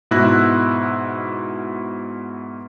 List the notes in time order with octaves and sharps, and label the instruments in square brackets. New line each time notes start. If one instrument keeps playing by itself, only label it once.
[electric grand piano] G#2 B2 E4 E6 F#6 A#6